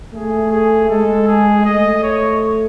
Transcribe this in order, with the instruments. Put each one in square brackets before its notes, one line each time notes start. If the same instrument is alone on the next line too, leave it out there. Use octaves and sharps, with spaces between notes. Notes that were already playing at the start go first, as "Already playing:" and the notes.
[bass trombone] A3 [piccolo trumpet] G#4
[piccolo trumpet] G#4
[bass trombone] G#3 [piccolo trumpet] A4
[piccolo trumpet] G#4
[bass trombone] A3 [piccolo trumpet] D#5
[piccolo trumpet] C#5